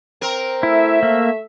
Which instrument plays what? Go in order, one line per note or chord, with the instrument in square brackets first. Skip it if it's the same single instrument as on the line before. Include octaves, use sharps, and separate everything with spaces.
[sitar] C4 A#4
[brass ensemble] A3 E5 [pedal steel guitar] E4
[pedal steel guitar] A#3